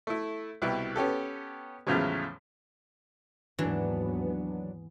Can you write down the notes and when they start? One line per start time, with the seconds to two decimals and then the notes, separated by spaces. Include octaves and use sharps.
0.07 A3 E4
0.62 C2 B2 E4 G4 B4
0.96 B3 C#4 G4 A4
1.87 E2 A2 C#3 F3 F#3 G#3
3.59 D#2 G#2 E3 F#3 B3 D4